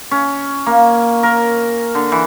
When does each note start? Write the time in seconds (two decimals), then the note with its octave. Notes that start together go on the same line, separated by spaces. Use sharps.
0.11 C#4
0.66 A#3
1.23 A#4
1.95 D3
2.12 E3